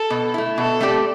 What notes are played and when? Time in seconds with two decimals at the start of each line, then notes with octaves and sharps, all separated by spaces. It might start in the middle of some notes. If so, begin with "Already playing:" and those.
Already playing: A4
0.10 B2
0.34 A3 E4
0.58 B2 A4
0.81 A3 C4 G4 D5